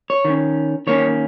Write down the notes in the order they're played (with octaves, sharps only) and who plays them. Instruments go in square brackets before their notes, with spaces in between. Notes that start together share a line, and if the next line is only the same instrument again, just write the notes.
[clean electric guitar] C#5
D#3
C#4
D#3 A#3 C#4 C#5